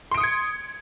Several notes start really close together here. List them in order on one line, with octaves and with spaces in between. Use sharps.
C6 D7 D#6 C#7 G#6